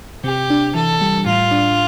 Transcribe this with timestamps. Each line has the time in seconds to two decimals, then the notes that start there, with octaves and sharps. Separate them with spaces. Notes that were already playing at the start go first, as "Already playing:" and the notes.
0.24 C3 G4
0.50 D4
0.75 E3 A4
1.01 G3
1.26 A2 F4
1.51 D4